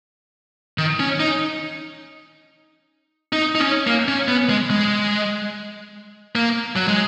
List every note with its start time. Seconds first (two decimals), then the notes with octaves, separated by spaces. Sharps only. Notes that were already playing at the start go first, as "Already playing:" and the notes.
0.78 D#3
1.00 C#4
1.20 D#4
3.33 D#4
3.55 D#4
3.59 C#4
3.87 A#3
4.08 C#4
4.28 B3
4.49 G#3
4.70 G#3
6.35 A#3
6.76 F#3
6.88 G#3